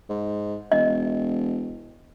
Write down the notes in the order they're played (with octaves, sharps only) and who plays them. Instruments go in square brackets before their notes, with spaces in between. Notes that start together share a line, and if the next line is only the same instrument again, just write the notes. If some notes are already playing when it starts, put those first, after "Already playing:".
[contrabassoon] G#2
[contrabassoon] E1 [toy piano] D#5